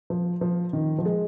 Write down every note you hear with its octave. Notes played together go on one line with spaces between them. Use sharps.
F3
F3
D#3
F3
G#3